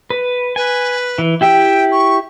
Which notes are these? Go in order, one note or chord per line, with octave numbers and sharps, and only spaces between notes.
B4
B4 G#5
E3
E4 G4 E5 G5
C#6